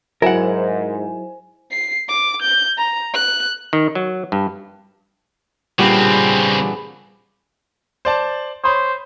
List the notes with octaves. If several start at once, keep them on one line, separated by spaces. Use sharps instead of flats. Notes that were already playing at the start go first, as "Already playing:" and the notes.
G#2 F#3 E4 A#4 C5 F#5 G#5
C7
D6
G6
A#5
F#6
D#3
F#3
G2
A#2 C#3 G3 B3 C4 D4 G4 G#4
C5 D5 A5
C5 C#5 B5 D#6